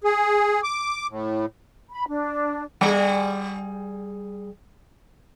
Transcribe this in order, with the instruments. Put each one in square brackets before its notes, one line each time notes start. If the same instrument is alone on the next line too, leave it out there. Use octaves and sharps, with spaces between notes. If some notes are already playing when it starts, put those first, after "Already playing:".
[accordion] G#4
D6
A2
[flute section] B5
D4
[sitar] G3 G#4